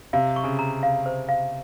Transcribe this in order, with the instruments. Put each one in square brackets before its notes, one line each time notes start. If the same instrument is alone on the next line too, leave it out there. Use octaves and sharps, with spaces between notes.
[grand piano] C3 [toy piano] F5
[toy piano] C#6
[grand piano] C#3
[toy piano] A#5
F5
C5
F5